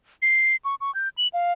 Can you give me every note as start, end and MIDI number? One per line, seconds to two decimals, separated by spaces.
0.22 0.56 96
0.65 0.75 85
0.81 0.94 85
0.95 1.09 91
1.18 1.28 102
1.33 1.53 77